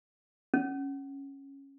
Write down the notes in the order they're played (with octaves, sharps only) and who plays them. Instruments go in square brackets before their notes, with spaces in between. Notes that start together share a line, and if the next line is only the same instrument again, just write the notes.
[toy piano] C#4